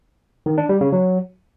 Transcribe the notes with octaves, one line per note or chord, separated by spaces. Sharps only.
D#3
D4
G3
C#3
F#3